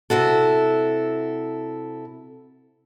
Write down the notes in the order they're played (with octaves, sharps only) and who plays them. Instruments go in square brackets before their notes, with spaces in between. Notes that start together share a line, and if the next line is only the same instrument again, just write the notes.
[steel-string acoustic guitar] C3 E4 F#4 A4